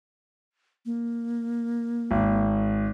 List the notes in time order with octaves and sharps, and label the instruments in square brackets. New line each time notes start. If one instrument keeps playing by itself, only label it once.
[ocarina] A#3
[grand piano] G#1